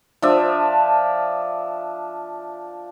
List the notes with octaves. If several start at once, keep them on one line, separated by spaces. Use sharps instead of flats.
F3 D4 E5